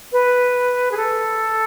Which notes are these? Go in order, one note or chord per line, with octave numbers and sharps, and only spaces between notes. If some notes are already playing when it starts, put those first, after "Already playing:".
B4
G#4
A4